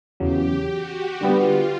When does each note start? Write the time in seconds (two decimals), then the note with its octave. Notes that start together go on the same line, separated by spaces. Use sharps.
0.20 E2 C#3 F#3 G4
0.71 F#4
1.21 D3 G3 B3 F4